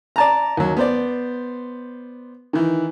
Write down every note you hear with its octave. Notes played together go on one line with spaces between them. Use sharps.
D5 A5 A#5
D#2 F#3
B3 C5 D5
D#3 E3